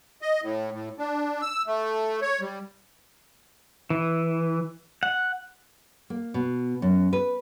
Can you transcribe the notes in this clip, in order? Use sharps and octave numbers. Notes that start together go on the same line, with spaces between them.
D#5
A2
A2
D4
E6
A3
C#5
G3
E3
F#5
A#3
B2
F#2
B4